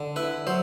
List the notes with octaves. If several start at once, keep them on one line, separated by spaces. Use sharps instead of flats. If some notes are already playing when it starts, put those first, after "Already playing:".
Already playing: D3
E4 B4
F#3 C5